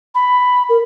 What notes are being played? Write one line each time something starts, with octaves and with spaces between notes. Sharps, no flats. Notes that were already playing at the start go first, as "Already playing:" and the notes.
B5
A#4